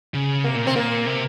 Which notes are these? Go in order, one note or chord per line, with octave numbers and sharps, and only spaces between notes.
C#3
C3 A#3
A#2
C3 C4
A#2 A#3
C3